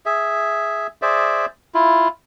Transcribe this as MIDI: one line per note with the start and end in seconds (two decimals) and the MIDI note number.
0.06 0.87 68
0.06 0.87 76
1.02 1.46 68
1.02 1.46 72
1.02 1.46 74
1.02 1.46 76
1.74 2.08 64
1.74 2.08 65